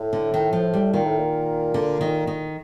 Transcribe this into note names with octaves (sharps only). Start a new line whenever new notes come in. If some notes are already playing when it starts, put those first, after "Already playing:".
Already playing: A2
D3
D#3
F3
G3
A#2 D#3
A2
A#2
D3
D#3
D#3